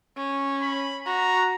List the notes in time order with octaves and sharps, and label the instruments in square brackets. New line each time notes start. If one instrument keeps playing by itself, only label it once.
[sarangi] C#4
[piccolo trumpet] B5
[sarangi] F#4 [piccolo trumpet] A#5